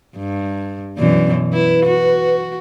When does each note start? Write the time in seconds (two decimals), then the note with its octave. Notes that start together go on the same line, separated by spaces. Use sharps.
0.17 G2
0.98 F#2 B2 E3 D5
1.53 E4 B4
1.86 F#4